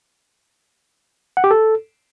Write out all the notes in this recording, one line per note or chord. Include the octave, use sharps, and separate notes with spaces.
F#5
G4
A4